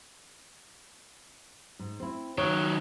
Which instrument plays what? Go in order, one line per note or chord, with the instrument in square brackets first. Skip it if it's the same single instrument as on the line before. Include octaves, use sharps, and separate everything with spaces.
[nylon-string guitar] G#2
C4 E4
[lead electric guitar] D#3 F#3 [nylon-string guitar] C#5